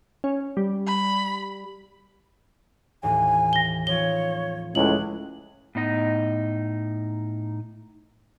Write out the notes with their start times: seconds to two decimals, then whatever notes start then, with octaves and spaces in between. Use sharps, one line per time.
0.24 C#4
0.57 G3
0.87 B5
3.03 D#2 A2 E3 G#5
3.53 A#6 G7
3.87 F3 C4 F4 C#5 G7
4.75 C#2 A2 E4 G#4 F#6 F#7
5.75 A2 B3 D#4 D#5